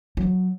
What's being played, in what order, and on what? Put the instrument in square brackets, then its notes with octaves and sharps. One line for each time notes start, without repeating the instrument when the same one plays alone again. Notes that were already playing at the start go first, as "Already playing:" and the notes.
[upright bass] F#3